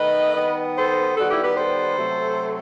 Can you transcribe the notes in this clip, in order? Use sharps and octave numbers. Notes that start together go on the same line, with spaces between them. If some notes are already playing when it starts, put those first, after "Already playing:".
Already playing: D#3 A3 B4 D#5
D#3 G3 B3
A4 C5
D#3 G3 B3 F#4 A4
E4 G4
G4 B4
A4 C5
C3 F#3 A3